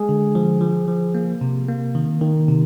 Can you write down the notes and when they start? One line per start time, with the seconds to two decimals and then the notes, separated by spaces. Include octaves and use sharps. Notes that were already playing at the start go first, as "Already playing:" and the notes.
Already playing: G#3 G#4
0.09 D3
0.35 F3
0.61 F3
0.88 F3
1.14 A#3
1.41 C3
1.69 A#3
1.95 D#3
2.21 D#3
2.48 C3